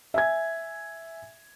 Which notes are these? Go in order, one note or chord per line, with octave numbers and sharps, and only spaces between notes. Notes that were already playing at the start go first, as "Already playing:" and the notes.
E5 G#5 G#6